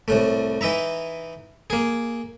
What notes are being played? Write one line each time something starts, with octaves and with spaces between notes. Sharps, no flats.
C2 A2 A3
E3 D#4 E5 A#5
A#3 G#4